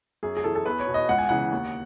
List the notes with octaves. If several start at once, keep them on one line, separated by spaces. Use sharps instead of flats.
F#2 G#4
G#4
E3 A4
A4
E2 B4
C#5
B2
D#5
C#2 F#5
G#5
C#3 E3 F#5
D#2